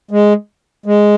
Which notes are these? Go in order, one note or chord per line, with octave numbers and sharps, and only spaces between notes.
G#3
G#3